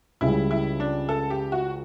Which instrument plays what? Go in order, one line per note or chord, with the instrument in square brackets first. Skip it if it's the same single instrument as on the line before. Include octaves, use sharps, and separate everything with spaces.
[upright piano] C#2 C#3 G3 C#4 [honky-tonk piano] E4
[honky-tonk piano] E4
D4
A4
G4
F#4